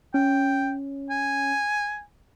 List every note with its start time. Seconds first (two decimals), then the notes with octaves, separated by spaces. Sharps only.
0.14 C#4 G5
1.10 G#5